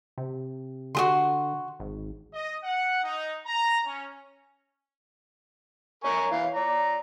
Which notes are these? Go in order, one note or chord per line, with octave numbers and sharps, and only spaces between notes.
C3
D3 F#4 G#4 C6
G#1
D#5
F#5
D#4
A#5
C#4
A#4 C#5 G#5 C#6
E3 C#5 F5
D5 A#5